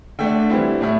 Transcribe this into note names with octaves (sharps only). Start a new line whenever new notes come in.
D3 A3 D4 G5
E3 G3 C4 E4
A2 A3 E4